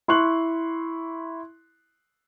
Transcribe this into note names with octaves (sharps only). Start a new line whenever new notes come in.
E4 C6 C#6 F#6 F#7